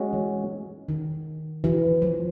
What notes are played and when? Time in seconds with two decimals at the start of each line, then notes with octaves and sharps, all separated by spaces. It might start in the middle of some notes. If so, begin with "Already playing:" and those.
Already playing: G#3 C#4 F#4
0.13 E3
0.88 D#3
1.64 E3
2.02 F3